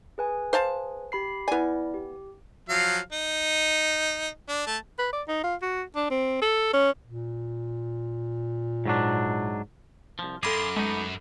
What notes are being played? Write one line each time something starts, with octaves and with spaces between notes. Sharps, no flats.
G#4 B4 G#5
C5 F5 A5
G4 B5 C7
B3 E4 D5 G#5
G4
F3 F#3 F5
D#4
D4
A3 A5
B4
D5
D#4
F4
F#4
D4
C4
A4
C#4
A#2
G#2 F#3 D4
C2 F3
F#2 F4 G#4 A4 B5 D6
G#3 A3 B3 D#4